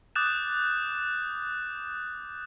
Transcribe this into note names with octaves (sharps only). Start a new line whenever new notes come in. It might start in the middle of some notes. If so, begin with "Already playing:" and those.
D6 D#6 F#6 G6 A6 E7